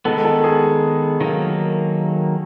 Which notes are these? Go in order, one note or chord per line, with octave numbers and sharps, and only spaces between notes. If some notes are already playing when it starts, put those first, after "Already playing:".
D#3 G#3 B3 A4
A4
G#4
D#3 F#3 A#3